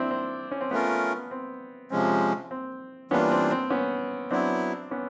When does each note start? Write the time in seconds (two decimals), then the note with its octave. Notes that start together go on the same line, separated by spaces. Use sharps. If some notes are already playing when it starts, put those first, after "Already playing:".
Already playing: C4 D4 E4
0.11 C4
0.51 C#4
0.61 C4
0.71 A3 B3 C#4 F4 A#4
1.31 C4
1.90 C3 F3 G#3 C4 C#4
2.51 C4
3.11 E3 G3 A#3 B3 C#4 D4 F4
3.32 C4
3.51 C4
3.70 B3 C#4
4.31 F#3 B3 C4 D4 E4
4.91 B3 C#4